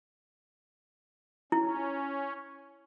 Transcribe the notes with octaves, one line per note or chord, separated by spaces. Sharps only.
C#4 E4